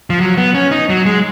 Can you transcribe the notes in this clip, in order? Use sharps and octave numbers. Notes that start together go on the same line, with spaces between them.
F3
F#3
B3
C#4
D#4
F#3
G#3